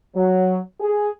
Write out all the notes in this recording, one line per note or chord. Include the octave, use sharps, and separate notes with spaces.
F#3
G#4